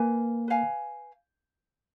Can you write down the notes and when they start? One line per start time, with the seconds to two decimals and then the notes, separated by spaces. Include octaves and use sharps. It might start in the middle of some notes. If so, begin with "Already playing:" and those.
Already playing: A#3 B4 F5 G#5
0.48 B4 F5 G#5